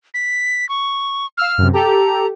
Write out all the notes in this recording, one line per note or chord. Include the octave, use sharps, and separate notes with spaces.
B6
C#6
F5 E6 F6
F#2 C3
G4 A4 A#5